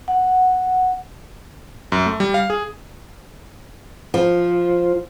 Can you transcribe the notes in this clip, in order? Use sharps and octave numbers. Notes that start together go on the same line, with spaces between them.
F#5
F#2
A3
G3
F5
G#4
F3